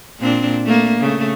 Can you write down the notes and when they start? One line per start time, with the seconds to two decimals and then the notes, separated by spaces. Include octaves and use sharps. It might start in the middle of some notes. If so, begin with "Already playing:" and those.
0.20 A#2 C4 D4
0.65 A3 A#3
1.00 C#3 A3